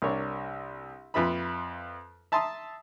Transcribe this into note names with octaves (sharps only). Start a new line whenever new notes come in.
C2 D4 A#4 C#5 D5
F2 F4 B4 E5 B5
E5 A5 A#5 C6 D#6